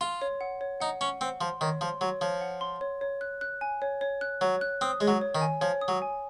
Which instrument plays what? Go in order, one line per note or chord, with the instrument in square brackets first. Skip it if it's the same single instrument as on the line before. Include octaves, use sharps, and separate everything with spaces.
[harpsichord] F4 [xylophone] C6
[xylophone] C#5
F#5
C#5
[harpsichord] D#4 [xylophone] F#5
[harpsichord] C#4 [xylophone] F#5
[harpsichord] C4 [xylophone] F#5
[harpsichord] F3 [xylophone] C6
[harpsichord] D#3 [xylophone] C#5
[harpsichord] F3 [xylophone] C6
[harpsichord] F#3 [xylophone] C#5
[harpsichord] F3 [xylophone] C#5
[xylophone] F#5
C6
C#5
C#5
F#6
F#6
G#5
C#5
C#5
F#6
[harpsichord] F#3 [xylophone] C#5
[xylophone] F#6
[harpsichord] C4 [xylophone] D#6
[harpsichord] G#3 [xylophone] C#5
[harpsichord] F#3
[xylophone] C#5
[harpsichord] D#3
[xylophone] G#5
[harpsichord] F3 [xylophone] C#5
[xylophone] D#6
[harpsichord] F#3
[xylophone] G#5